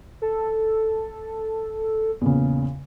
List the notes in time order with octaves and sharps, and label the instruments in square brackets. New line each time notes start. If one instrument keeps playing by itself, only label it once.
[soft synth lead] A4
[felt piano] E2 A#2 C#3